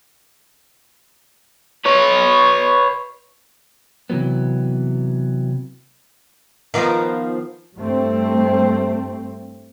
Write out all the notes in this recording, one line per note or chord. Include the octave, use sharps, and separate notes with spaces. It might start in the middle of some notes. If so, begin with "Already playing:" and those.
B4 C#5
C3 E3 F#3 B3
D#3 F3 B3
G2 A3 C4